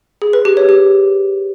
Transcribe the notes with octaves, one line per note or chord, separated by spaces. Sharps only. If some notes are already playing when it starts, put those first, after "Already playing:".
G#4
B4
G4
C#5
G4